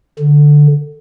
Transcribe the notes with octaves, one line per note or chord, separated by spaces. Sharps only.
D3